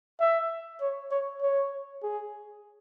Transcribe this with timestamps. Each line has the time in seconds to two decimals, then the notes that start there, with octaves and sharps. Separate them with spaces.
0.20 E5
0.81 C#5
1.11 C#5
1.42 C#5
2.03 G#4